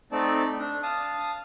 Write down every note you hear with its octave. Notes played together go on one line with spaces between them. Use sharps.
A3 C4 D#4 D5 A5
D4
F5 A5 D#6